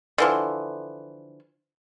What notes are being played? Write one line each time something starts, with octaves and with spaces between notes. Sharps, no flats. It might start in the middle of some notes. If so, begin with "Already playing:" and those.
D3 E3 F3